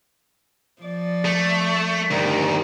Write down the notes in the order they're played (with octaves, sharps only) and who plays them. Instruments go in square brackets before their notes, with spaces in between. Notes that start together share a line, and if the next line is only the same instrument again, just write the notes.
[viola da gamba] F3 D5
[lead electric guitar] A3
[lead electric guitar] D2 D#3 [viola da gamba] G2